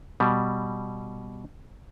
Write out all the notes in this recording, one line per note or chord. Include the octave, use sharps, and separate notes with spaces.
B2 G3